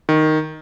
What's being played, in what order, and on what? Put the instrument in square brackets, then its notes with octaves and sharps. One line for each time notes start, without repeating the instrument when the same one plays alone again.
[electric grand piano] D#3